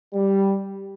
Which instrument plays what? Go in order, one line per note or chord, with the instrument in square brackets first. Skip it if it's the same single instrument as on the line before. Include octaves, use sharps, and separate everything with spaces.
[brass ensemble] G3